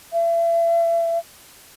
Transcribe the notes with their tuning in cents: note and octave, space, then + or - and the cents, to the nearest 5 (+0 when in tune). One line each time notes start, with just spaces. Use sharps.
E5 +35